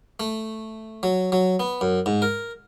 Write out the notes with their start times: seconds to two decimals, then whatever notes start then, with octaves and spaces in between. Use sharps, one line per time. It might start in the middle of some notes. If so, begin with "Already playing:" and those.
0.20 A3
1.03 F#3
1.32 F#3
1.60 B3
1.81 F#2
2.06 G#2
2.22 A#4